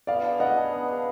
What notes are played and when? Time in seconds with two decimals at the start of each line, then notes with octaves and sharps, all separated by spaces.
0.07 B3 D5 F5
0.24 D4 G#4
0.40 B3 D#5 F#5
0.57 D4 G#4
0.72 B3
0.88 D4 G#4